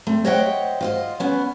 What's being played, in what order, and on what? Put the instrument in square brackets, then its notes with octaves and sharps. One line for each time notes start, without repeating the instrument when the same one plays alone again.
[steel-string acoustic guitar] A3 C4
C5 C#5 D#5 E5 F#5 G5
F4 C5 D#5
B3 C#4